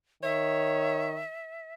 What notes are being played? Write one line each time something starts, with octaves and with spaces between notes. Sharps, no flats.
D#3 C#5 E5